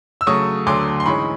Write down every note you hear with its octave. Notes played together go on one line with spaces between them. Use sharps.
E6
C#3 F#3 A3 C#6 D#6
D2 D3 F#3 A3 C6 D6
C6
G#2 E3 G#3 C#4 B5 C#6